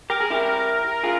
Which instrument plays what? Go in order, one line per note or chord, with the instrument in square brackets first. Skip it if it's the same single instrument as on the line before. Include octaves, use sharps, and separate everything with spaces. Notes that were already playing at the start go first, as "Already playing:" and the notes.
[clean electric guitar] G4 [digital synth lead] A#4
[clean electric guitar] G#4
E4 G4
F4 G#4